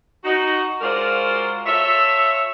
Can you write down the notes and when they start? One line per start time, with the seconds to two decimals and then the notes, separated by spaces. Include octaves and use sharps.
0.24 D#4 F#4
0.81 G#3 F4 F#4 A#4 C5 D5
1.66 F4 A4 C#5 E5